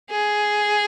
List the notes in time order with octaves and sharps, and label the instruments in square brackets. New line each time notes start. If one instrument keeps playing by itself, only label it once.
[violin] G#4